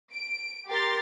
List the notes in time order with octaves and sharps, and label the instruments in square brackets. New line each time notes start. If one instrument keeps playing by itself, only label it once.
[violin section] D7
G4 A#4 C6 A6